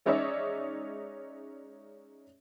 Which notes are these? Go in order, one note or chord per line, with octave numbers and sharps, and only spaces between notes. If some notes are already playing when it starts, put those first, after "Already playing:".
G#3 C#4 D#4 C#5 D5 E5